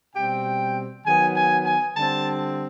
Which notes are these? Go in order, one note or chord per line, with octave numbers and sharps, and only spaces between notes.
B2 G3 C4 G5
D#3 F#3 B3 G#5
G#5
G#5
D3 G3 C4 A5